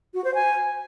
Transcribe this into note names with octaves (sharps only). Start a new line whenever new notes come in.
F#4
C5
G#5